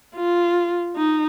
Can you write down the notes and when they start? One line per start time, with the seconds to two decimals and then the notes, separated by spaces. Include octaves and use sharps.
0.16 F4
0.97 D#4